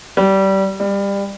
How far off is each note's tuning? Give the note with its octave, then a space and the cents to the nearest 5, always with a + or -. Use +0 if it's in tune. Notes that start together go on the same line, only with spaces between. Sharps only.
G3 -20
G3 +25